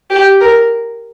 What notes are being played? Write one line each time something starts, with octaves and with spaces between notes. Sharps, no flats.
G4
A#4